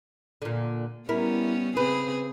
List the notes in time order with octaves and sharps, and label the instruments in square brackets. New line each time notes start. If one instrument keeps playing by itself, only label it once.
[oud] A#2 D3
[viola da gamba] G3 B3 C#4 [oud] E4 A#4
[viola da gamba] C#3 C4 G#4 [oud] B4